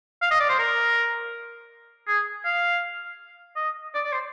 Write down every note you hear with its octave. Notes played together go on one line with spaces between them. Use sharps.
F5
D#5
D5
C5
A#4
G#4
F5
D#5
D5
D5
C5